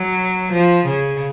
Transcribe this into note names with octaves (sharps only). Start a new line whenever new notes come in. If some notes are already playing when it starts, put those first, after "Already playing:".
Already playing: F#3
F3
C#3